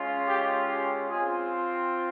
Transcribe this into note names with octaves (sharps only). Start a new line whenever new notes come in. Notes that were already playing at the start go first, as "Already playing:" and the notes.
Already playing: G#3 C#4 F4
G4
G4
C4 F4 G#4